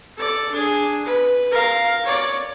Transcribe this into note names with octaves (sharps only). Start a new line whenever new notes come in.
A4 D5
D4 G#4
B4
A#4 F5
C#5 D5